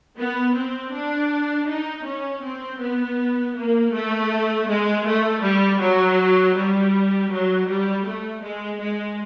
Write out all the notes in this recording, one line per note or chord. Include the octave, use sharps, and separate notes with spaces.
B3
C4
D4
D#4
C#4
C4
B3
A#3
A3
G#3
A3
G3
F#3
G3
F#3
G3
A3
G#3
G#3